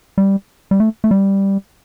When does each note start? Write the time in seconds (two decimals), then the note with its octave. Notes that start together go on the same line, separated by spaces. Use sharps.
0.18 G3
0.71 G3
0.80 A3
1.04 A3
1.11 G3